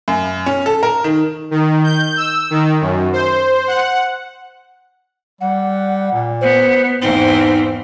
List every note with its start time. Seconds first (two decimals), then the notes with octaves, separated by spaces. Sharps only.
0.08 F#2
0.46 C#4
0.66 A4
0.83 A#4
1.04 D#3
1.51 D#3
1.84 G6
2.17 E6
2.50 D#3
2.81 F#2
3.13 C5
3.67 F#5
5.41 G3 F#5
6.12 A#2
6.41 B3 C5
7.02 E2 G#2 C4 D#4